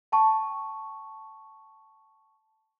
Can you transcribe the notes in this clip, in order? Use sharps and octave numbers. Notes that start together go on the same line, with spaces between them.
G5 A5 C#6